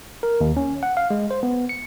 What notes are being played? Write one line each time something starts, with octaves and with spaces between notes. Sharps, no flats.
A#4
D#2
C#4
F#5
F5
G#3
C5
B3
C#7